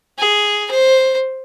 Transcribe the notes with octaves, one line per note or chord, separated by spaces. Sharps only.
G#4
C5